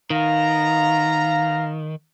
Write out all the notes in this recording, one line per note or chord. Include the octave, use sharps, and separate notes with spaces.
D#3 B3 F5 A#5